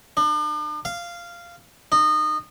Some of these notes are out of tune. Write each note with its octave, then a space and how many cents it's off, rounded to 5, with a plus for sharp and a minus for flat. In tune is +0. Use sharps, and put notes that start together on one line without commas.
D4 +45
F5 -10
D#4 -25